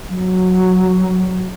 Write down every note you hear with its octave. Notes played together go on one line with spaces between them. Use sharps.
F#3